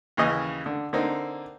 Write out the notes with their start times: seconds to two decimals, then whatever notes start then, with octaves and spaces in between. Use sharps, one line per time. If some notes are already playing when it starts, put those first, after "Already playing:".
0.17 D#2 C#3 E3 D#5
0.66 D3
0.93 D3 A#3 C4 D#4